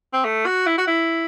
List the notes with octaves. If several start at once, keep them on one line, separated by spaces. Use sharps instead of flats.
C4
A3
F#4
E4
F#4
E4